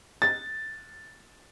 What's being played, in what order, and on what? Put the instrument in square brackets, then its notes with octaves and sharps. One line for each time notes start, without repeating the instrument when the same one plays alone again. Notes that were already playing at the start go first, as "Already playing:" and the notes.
[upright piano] A6